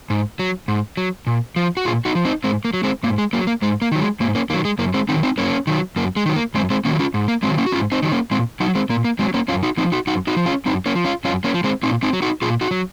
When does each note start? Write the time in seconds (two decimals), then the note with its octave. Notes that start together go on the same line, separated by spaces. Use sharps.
0.10 G#2
0.39 F#3
0.68 G#2
0.97 F#3
1.27 A#2
1.56 F3
1.77 F#4
1.85 A#2 F4 G#4
2.05 D#4 F#4
2.15 F3
2.25 C4 D#4
2.44 G#2 G#3 C4
2.65 A#3
2.74 F#3
2.83 G#3 C4
3.03 G#2 A#3
3.18 G#3
3.33 F#3 A#3
3.47 A#3
3.62 G#2 G#3
3.82 A#3
3.92 D#3 F#3
4.01 G#3
4.20 G#2 A#3
4.35 A#3 C#4
4.50 D#3 A#3
4.53 F#3
4.65 G#3
4.79 F#2 A#3
4.94 G#3 C4
5.09 D#3 F#3 C4 D#4
5.23 C4 D#4
5.38 F#2 A#3 C#4
5.67 D#3 F#3
5.96 F#2 A#3
6.16 G#3
6.26 D#3 F#3
6.36 A#3
6.54 F#2 G#3 C4
6.70 G#3 C4
6.85 D#3 F#3 A#3 C#4
6.99 C#4 F4
7.14 G#2
7.28 A#3
7.43 F#3 G#3 C4
7.48 D#3
7.58 A#3 C#4
7.66 F#4
7.72 G#2 C#4 F4
7.92 C4 D#4
8.02 D#3 F#3
8.12 A#3 C#4
8.31 A#2 G#3 C4
8.60 F#3 D#4 F#4
8.75 G#3 C4
8.89 A#2 A#3
9.05 A#3
9.19 F#3 G#3 C4
9.34 A#3 C#4
9.48 F#2 C#4 F4
9.63 D#4 F#4
9.77 F3 C4 D#4
9.92 D#4 F#4
10.07 F#2 D#4 F#4
10.27 D#4 F#4
10.37 F3
10.46 C#4 F4
10.66 F#2 C4 D#4
10.86 A#3 C#4
10.95 F3
11.05 C#4 F4
11.25 F#2 C#4 F4
11.44 A#3 C#4
11.54 F3
11.64 G#3 C4
11.83 A#2 C4 D#4
12.03 C4 D#4
12.13 F#3
12.22 D#4 F#4
12.42 A#2 F4 G#4
12.61 D#4 F#4
12.71 F#3